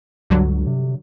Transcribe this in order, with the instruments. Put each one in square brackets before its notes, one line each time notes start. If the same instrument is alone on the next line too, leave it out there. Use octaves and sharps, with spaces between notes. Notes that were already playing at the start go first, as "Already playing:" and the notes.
[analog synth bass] C#2 [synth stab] G2 D3 F#3
[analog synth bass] C3